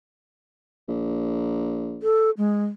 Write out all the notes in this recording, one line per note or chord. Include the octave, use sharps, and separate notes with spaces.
A#1
A4
G#3